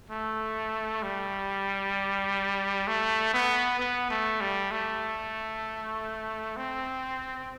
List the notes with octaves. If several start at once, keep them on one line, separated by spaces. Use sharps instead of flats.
A3
G3
A3
B3
B3
A3
G3
A3
C4